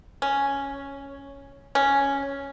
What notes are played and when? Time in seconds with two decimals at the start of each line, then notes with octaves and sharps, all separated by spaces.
0.22 C#4
1.75 C#4